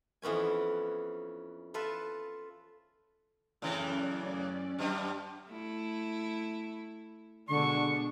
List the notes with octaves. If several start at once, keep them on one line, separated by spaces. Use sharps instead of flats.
F2 E3 B3 C#4 G#5
F4 A4 B4 E5
F#2 A2 C#3 E3 C#4 D5
F#2 G3
A3 E4
B2 D3 G#3 D4 C#6